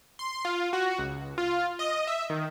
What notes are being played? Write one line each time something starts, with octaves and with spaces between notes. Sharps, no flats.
C6
F4
F#4
C#2
F4
D#5
E5
D#3